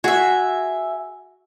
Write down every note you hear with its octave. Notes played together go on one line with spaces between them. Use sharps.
F#4 G#4 E5 G#5